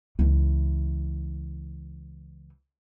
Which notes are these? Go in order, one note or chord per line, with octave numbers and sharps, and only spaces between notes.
C#2 E3